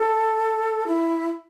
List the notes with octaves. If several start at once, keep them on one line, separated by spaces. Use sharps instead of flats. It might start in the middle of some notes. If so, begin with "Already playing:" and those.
Already playing: A4
E4